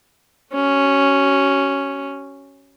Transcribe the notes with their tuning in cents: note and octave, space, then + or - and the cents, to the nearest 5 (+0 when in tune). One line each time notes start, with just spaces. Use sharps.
C#4 +0 F#4 +40